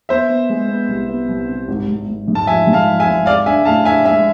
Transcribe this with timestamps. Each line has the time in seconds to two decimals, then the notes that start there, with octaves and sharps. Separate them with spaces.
0.09 B3 C5 E5
0.29 B3
0.49 G#3
0.69 B3
0.89 C2
1.09 B3
1.28 C2
1.48 C3
1.68 G#1
1.88 G#1
2.07 G#1
2.28 G#2
2.35 A5
2.47 F3 E5 G#5
2.67 G#2
2.73 F5 A5
2.87 F3
3.00 E5 G#5
3.06 G#1
3.26 G#4 D5 F5
3.46 D4 E5 G#5
3.65 A2 F5 A5
3.85 D4 E5 G#5
4.05 G#3 E5 G#5